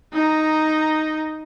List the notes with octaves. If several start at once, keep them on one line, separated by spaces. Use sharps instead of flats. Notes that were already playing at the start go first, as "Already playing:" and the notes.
D#4 A#5